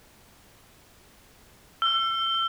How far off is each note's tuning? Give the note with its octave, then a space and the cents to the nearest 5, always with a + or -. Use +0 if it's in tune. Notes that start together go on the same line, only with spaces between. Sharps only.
E6 +35